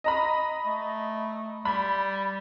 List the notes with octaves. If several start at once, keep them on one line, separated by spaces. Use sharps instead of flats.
D#5 A#5 B5
A3
G3 B5